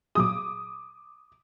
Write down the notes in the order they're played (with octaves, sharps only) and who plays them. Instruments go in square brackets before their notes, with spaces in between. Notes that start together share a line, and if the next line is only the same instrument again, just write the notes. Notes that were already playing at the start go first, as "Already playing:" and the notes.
[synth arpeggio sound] A#2 F#3 G#4 [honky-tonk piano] D6 D#6